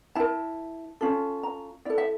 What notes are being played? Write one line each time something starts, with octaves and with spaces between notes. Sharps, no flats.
E4 A#4 A5
C#4 F4 A4
A#5
E4 A4 D5
E5